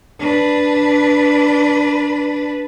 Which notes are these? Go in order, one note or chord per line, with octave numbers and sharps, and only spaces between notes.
D4 B4